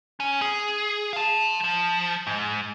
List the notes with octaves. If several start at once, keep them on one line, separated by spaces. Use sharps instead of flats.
C#4
G#4
F5 A5
F3
G#2